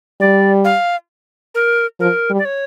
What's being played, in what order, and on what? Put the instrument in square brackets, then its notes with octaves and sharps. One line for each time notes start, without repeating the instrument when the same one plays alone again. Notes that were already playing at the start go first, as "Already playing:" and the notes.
[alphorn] G3 [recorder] D5
[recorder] F5
A#4
[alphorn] F3 [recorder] A#4
[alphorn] G3
[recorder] D5
C#5